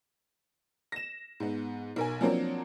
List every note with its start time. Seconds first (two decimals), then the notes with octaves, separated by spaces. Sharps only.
0.92 A#6 E7
1.40 G#2 B3
1.96 B1 A#4 G#5
2.21 F3 F#3 A#3 C4 D4 A#4